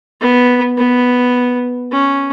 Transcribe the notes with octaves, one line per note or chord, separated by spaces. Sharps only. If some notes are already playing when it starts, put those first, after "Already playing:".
B3
B3
C#4